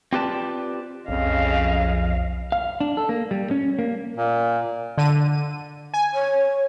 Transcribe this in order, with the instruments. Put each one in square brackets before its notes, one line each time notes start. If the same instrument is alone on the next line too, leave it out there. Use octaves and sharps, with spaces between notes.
[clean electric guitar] C4 F4 G4 B4 D5 A5
[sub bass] B1 [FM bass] F2 [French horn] C#3 [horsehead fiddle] D#5 F5
[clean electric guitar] F5
D4
A4
A#3
G3
C#4
A#3
[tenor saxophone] A#2
[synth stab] D3 D#7
G#5
[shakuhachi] C#5